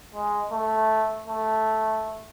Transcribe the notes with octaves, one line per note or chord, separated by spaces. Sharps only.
G#3
A3
A3